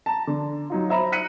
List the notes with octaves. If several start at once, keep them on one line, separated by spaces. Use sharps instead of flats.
A5 A#5
D3
F#3 D#4 F4
C5 E5 A#5 B5
A#5 F#6 B6 C#7 D#7